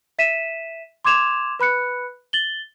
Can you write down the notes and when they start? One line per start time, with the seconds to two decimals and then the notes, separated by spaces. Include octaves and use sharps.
0.19 E5 B6 D#7 E7
1.05 C6 D6 G#6 E7 F7
1.59 B4 B5 F#6 C#7
2.33 A6 F#7 G7